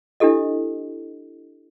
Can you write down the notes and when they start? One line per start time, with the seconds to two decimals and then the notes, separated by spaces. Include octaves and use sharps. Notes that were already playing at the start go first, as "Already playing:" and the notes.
0.20 D4 E4 G4 A4 D#5